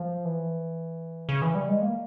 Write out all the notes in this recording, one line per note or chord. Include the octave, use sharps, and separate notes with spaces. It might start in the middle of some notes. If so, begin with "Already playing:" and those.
Already playing: F3
E3
C#3
E3
G3
G#3
A#3